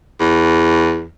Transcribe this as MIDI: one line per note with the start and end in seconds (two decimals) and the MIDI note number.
0.20 1.04 40